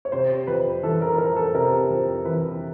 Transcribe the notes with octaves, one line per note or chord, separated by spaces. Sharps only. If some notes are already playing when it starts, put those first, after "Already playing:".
C#5
C3 C5
F2 B4
E3 A4
A#4
F2 A#4
A4
C3 A#4
F2
E3 B4